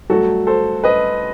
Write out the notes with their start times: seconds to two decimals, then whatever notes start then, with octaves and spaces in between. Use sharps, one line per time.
0.10 G2 F#3 A3 F#4 A4
0.47 A4 C5
0.84 B4 D#5